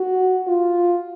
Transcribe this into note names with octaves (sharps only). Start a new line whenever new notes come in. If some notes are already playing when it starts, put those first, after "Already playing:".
Already playing: F#4
F4